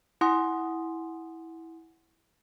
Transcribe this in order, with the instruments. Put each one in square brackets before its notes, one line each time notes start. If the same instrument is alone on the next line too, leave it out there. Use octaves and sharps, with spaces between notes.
[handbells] E4 F#5 G#5 C6 D#6